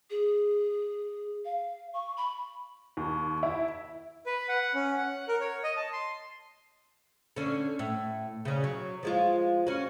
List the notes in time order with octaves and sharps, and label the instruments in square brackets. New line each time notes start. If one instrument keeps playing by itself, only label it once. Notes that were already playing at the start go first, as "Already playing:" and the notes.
[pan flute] G#4
F5
C#6
B5
[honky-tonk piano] D#2
E4
[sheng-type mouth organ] B4
F#5
C#4
F#5
A#4
C#5
D#5
A5
C6
[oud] D3 C#4
A2
C#3 C#4
F#3
F3 G#3 F4
C#4 F#4